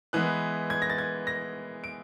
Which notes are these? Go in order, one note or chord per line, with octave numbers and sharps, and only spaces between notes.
E3 G#3 B3 F#6
G#6
A#6
A6
G#6
A#6
D7